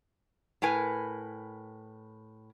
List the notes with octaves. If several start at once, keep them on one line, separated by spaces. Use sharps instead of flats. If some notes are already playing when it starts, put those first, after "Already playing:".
A2 A#4 B4 G#5